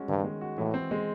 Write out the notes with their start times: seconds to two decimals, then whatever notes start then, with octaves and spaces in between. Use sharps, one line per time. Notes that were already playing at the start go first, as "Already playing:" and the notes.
Already playing: G3 G#3 C#4 F#4
0.08 G2 D#3
0.24 G#3
0.41 F#4
0.58 A2 E3
0.74 C4
0.91 G#3